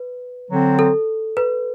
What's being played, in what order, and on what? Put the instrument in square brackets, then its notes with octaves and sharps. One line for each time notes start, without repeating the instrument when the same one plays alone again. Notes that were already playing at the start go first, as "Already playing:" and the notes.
Already playing: [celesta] B4
[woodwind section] D3 F#3 C4
[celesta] A4
B4